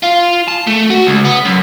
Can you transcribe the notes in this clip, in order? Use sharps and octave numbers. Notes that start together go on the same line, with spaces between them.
F4
A5
A3
F#4
C#2
B3
F#2